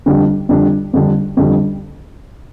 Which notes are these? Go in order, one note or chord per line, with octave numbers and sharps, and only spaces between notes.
F2 D3 G3 D4
F2 D3 G3 D4
F2 D3 G3 D4
F2 D3 G3 D4